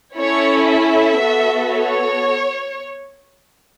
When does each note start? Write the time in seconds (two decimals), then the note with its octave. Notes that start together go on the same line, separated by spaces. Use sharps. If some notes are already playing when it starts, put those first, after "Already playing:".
0.18 C#4 E4 A4 C#5
0.70 E5
1.23 B3 F#4 A4
1.74 C#5